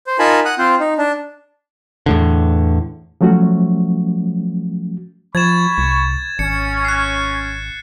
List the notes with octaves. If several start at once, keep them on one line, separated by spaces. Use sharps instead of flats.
C5
D#4 F4 A#4 G#5 A5 B5
F#5 D#6 F#6
C4 F4 C5
D#4
D4
E2 A2 D3
F3 F#3 A3 C#4 F#4
F3 B5 C#6 G#6 A6 E7
C2
G#1 C#4 C#7
F#6 C7